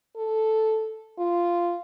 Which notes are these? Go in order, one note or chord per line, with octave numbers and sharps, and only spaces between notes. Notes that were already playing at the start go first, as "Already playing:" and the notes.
A4
F4